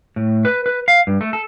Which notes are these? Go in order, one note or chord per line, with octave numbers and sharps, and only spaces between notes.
A2
B4
B4
F5
G2
A3
A4